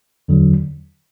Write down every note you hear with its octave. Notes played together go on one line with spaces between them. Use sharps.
E2 D3 F#3